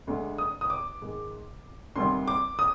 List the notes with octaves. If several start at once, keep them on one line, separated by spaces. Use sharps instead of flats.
D2 D3 G#3
D#6
D#6
D6
G#2 D#3 G#3
D2 C3 D#3 G3 C6
D6
D#6